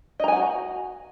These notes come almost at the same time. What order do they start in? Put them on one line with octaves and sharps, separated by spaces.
D#5 A#5 G#5 F#5 F#4